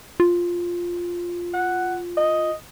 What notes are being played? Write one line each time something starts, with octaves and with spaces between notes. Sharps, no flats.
F4
F#5
D#5